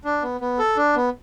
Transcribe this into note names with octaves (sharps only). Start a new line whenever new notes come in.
D4
B3
B3
A4
D4
B3